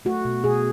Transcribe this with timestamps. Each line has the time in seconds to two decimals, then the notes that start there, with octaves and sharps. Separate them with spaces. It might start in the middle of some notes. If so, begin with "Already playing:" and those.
0.05 A3 F#4
0.25 B2
0.44 B2 G#4